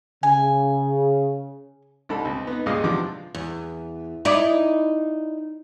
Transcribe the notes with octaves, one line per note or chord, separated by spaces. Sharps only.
C#3 G#5
C2 D4 D#4 A4 B5
C#2 C4
B3 D#4
C#2 G2 A#2 G#4 D#5 F5
E2 C3 F3 D4 D6
E2
D#4 E4 D5